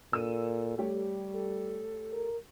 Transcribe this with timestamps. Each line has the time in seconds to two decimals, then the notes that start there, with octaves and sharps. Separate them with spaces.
0.13 A#2 A4 E6 D#7
0.78 G3 A3 G4 C#5
1.33 A4
2.12 A#4